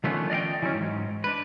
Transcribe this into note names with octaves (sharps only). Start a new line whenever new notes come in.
D#3 F3 A3 B3 C#4 D4
D5 D#5 F5 G5
E3 F#3 G3 C#4
G#2
D4 B4